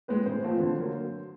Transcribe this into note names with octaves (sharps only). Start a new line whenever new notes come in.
G#3 C4 B4
A2 C5
F3 A3 C4 F4
D3
F#3 A#3